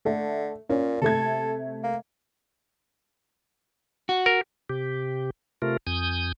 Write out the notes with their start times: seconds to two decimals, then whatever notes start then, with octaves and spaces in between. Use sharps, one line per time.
0.05 D3 A3
0.69 A#2 C#4
1.01 C3 A3 A4 G#6
1.83 A#3
4.09 F#4
4.26 A#4
4.69 C3 G4
5.62 C3 A3 F4 A#4
5.87 F2 G#5 D#6 G6